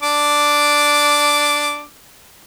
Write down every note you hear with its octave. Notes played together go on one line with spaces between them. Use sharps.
D4 D6